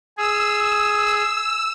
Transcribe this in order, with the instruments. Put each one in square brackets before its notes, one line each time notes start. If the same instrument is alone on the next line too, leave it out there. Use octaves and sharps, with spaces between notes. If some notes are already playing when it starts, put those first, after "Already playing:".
[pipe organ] G#4 [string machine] E6